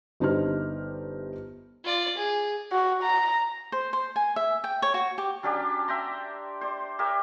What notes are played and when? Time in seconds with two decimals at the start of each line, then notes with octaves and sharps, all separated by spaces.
0.20 G1 D4 D#4 G4 C5 F6
1.84 F4 D5
2.17 G#4
2.72 F#4
3.03 A#5
3.72 C5
3.93 C5
4.16 G#5
4.36 E5
4.64 G5
4.82 C#5
4.94 F#4
5.18 G4
5.43 F#3 C#4 D4 G4
5.88 E5 G5 A#5 C6
6.61 C5 D5
6.99 G4 A#4 C#5 E5